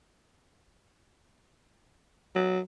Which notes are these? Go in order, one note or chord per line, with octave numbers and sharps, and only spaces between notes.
F#3